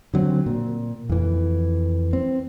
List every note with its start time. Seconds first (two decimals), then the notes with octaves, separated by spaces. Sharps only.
0.14 D3 F#3 C4
0.46 A#2
1.09 F2 E3
2.13 C4